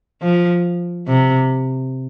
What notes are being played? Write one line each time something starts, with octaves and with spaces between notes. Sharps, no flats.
F3
C3